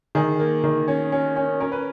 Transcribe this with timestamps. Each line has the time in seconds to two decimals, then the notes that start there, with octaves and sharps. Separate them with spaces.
0.15 D#3 G#4
0.40 A#3
0.64 D#3
0.88 C#4
1.12 C#4
1.36 C#4
1.60 C#4 A#4
1.72 B4